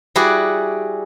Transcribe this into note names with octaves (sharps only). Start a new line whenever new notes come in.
G3 E4 F#4 G#4 D5